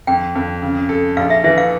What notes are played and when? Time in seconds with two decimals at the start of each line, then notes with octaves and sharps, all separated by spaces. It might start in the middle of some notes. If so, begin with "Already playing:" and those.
0.07 F2 G5
0.35 F2
0.62 C#3
0.89 A4
1.17 A#1 F5
1.30 E5
1.44 E3 E5
1.58 F5